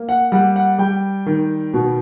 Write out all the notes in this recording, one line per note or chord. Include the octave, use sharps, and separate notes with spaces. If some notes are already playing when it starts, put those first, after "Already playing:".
Already playing: A#3
F#5
G3 F#5
F#5
G3 G5
D#3
B2